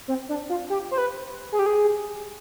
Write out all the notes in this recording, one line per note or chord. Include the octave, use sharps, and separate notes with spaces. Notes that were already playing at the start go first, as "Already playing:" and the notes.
C4
D4
F4
G4
C5
B4
G#4
G4
G#4